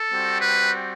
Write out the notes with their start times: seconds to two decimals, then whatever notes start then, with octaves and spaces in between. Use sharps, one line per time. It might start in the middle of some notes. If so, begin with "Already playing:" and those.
Already playing: A4
0.11 G3 C4 F#4
0.40 B4